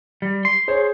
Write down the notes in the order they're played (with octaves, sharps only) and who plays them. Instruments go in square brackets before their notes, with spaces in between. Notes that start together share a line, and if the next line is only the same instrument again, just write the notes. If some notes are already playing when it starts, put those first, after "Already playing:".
[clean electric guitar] G3
C6
[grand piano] G#4 C5 C#5